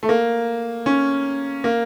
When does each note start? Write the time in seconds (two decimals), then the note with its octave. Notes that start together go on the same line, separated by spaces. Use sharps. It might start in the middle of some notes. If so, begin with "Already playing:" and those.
0.03 A3
0.09 A#3
0.86 C#4
1.64 A#3